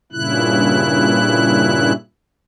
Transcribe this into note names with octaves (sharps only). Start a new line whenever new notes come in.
G2 A#2 C#3 E4 F#6